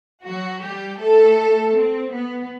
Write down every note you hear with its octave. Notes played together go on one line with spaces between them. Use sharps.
F#3 F#4
G3 G4
A3 A4
C4
B3